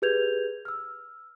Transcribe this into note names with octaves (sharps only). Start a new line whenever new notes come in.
G4 G#4 B4 G6 G#6 F7
E6 F6